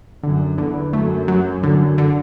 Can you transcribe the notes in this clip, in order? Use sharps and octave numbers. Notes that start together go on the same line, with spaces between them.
F#2 D3
E2 D3
F#2 A3
F#3
F#2 D3
D3